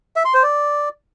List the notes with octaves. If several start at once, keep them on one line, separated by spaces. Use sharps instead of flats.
E5
C6
C5
D5